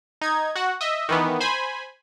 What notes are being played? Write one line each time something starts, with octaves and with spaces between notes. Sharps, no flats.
D#4 G#6
F#4 F#5
D#5 E5
D#3 E3 B3
C5 G#5 B5